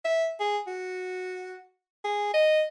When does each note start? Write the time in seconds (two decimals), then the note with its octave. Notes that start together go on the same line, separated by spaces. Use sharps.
0.05 E5
0.40 G#4
0.67 F#4
2.04 G#4
2.34 D#5